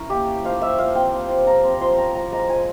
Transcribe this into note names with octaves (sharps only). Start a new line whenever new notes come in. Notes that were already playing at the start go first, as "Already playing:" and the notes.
Already playing: C#4 E4 A#4
A#3 G4
C#4
F3 F5
F4 E5
F3 F5
C4 G5
F3
F4
F3 A#5
C4
F3 C6
C#4 A#5
F3 A#5
G#3 A#5
F3 G#5